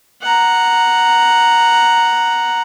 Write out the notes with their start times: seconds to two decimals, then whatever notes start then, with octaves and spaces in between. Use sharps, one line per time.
0.22 F#5 A#5